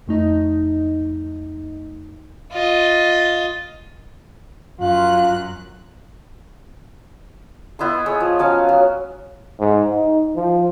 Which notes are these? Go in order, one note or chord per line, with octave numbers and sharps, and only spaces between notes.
F2 A3 D#4
F4 D#5
F#2 F4 F#6
B3 E4 D#5 C6
G#4 C#5
F3
F#3 C#4 F5
F#3
G#2
D#4
F3